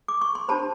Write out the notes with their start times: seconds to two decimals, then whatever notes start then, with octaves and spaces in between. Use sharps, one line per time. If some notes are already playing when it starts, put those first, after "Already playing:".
0.08 D6
0.21 C#6
0.35 C6
0.48 D4 G4 C5 A5 B5